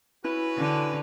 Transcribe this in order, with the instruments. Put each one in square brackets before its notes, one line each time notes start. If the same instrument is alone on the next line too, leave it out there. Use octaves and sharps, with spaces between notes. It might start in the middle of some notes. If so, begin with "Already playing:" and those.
[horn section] C#4 F#4 B4 [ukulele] E4
[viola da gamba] D3